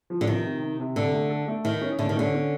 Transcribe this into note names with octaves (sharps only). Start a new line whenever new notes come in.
F3
D3
C3 D#3
C3
C3
C3
D3 A4
A3
A4
A3
D#3 E4
C#4
D3 A3
D#3
D3 C#4
C#4